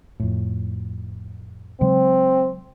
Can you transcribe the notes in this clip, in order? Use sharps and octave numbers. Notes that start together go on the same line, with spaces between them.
F2 A2
C#3 F#3 G#3 C4